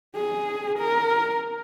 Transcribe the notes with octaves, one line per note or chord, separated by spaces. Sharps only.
G#4
A#4